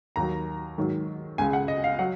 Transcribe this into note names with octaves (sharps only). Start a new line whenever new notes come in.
D#2 D#3 F#3 A#5
G#2 D#3 F#3
C#2 C#3 G#3 G#5
F#5
D#5
F5
F#3 F#5